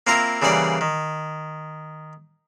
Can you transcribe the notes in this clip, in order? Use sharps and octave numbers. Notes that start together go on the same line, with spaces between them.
A#3 C4 E4 F4 A#4 A#5
C#3 E3 G3 A#3 D5 F#5
D#3